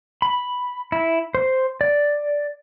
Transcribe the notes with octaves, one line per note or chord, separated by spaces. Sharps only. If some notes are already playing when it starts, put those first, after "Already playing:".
B5
E4
C5
D5